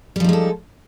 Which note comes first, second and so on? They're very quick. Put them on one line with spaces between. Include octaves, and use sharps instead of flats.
G3 F3 D#4 G#3 A4